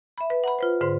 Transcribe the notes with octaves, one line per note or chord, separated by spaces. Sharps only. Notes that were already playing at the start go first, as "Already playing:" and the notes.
E5 B5
B4
F#5 A#5 B5
F4 B4 C5
G#2 D3 C5 C6